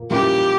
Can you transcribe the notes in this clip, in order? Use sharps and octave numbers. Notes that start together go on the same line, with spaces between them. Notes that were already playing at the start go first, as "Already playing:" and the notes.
Already playing: A#2 A#3
A#2 G3 A#3 C#4 E4 G4